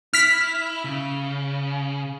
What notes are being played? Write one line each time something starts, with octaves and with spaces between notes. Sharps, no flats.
E4 F6 B6
C#3